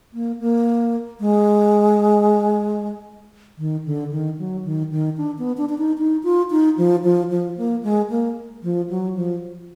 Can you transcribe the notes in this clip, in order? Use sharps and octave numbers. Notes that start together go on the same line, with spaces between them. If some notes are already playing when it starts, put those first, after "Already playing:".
A#3
A#3
G#3
D#3
D3
D#3
F#3
D#3
D#3
D4
B3
D4
D4
D#4
D#4
F4
D#4
F3
F3
F3
A#3
G#3
A#3
F3
F#3
F3